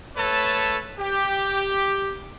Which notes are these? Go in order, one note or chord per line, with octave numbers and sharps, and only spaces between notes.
A3 A4 B4 C#5 A5
G4